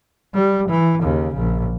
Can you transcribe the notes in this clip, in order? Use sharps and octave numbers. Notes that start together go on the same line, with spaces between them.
G3
E3
D#2 C#3
A#1